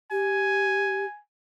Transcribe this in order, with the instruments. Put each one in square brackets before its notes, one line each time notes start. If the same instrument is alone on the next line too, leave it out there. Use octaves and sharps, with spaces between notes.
[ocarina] G4 [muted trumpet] G#5